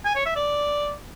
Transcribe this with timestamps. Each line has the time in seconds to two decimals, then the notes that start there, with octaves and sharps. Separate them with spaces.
0.05 G#5
0.15 C#5
0.26 E5
0.36 D5